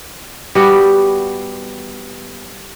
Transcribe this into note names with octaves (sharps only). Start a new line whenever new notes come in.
G3 B3 F#4